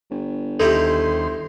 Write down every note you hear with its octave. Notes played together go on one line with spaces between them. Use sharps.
G1
D#2 D#4 E4 G4 A4 C5 C6